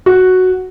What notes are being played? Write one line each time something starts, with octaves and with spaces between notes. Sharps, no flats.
F#4